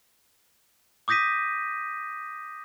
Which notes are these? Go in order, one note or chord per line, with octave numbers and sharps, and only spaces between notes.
D6 D#6 G6 A#6 B6 D#7